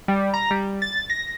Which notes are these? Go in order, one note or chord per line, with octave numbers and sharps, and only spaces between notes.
G3
A#5
G3
A6
A#6